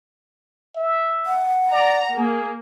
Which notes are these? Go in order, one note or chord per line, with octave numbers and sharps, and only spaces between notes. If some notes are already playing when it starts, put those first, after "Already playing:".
E5
F#5
D5 A#5
A#3 G#4